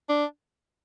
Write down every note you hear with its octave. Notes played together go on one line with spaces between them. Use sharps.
D4